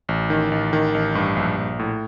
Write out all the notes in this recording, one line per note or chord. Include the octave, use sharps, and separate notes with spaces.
A1
D#3
A1
D#3
A1
G2
A#1
A#1
A2